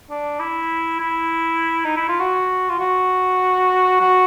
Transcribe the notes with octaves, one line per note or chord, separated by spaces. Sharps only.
D4
E4
E4
D#4
E4
F4
F#4
F4
F#4
F#4